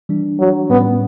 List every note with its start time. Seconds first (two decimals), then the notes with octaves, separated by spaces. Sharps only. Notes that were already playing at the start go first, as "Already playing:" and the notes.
0.09 E3 G3 D4
0.39 F#3
0.70 A2 G3 B3 C#4